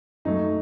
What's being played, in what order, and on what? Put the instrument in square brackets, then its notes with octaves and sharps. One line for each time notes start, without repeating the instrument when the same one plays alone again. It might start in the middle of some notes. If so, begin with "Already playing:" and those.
[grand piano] F#2 F#3 A3 D#4